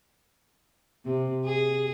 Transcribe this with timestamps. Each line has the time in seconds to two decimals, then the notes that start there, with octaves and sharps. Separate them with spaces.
1.05 C3
1.45 G#4